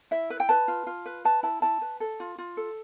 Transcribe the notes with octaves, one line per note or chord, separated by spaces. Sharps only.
E4 E5
B4
G5
B4 A5
F4
F4
B4
B4 A5
E4 A5
E4 A5
B4
A4
F4
F4
A4